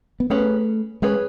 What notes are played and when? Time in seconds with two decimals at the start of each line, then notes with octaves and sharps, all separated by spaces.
0.20 B3
0.30 A3 C#4 G#4 B4
1.02 G#3 C#4 G#4 B4